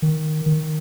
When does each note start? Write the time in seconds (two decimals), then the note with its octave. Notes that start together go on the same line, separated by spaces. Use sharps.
0.02 D#3
0.46 D#3